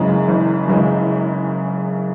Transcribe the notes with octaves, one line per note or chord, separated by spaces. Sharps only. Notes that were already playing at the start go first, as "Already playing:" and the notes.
Already playing: F#1 F#2 C#3 E3 G#3
F#1
F#2 C#3 E3 G#3